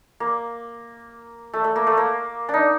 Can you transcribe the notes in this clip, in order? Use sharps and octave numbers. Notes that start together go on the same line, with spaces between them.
A#3
A3
A3
A#3
A3
A#3
D4 D#4